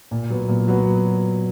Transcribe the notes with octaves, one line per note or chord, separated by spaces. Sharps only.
A#2
F#3 B3
A#2
F#3 B3